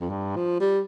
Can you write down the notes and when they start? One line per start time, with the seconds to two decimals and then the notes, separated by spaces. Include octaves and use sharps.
0.01 F2
0.10 G2
0.36 F3
0.60 G3